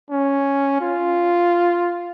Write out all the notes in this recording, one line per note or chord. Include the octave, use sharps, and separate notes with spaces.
C#4
F4